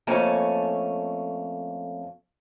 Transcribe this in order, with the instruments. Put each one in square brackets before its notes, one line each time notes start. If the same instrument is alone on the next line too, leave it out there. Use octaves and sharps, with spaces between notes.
[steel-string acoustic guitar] F2 A3 A#3 C#4 G#5 A5